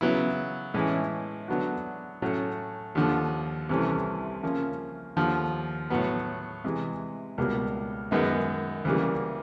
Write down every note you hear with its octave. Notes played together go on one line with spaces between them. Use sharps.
C#3 F#3 B3 E4
A2 E3 G#3 C#4 E4
D3 F#3 B3 D4 F#4
A2 F#3 A3 C#4
D#2 D3 F3
C2 C3 E3 A3 C#4
C#3 F3 A#3 C#4
D#2 D3 F3
A2 F#3 B3
C3 E3 G#3
C#2 B2 G3 A#3
F#2 D#3 G#3 B3 D#4
D2 C#3 E3 G3 A#3